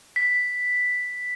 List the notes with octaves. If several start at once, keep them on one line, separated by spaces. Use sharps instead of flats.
B6